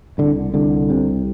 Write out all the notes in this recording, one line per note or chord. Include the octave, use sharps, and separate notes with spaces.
C2 D3
C2 D3
C3